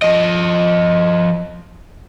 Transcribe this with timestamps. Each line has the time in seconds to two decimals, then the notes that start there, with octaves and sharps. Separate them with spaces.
0.02 F3 D#5